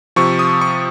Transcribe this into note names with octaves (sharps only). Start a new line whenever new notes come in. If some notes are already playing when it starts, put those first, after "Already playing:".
C3 F3 C#6
D#6
C#6